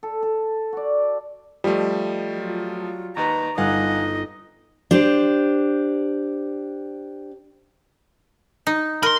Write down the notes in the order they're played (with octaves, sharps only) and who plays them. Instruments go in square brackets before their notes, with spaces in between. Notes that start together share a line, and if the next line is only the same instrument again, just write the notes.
[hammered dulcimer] A4
A4
F#4 D5
[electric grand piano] F3 A3 [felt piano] G3 [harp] D#5
[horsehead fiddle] F#3 F4
[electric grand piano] D#2 D#4 B4 [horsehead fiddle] A#5 [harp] C#6
[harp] G1 F#6 [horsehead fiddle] D#4 D#5 [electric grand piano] F5 F#5 G#5
[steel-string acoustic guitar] D4 G4 C5
[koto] D#4
[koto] A#4 [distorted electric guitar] B5 C6